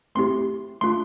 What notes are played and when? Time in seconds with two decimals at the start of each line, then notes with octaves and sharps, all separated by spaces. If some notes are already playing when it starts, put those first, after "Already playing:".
0.15 A3 C4 E4 G4 C6
0.81 A3 D4 F4 C6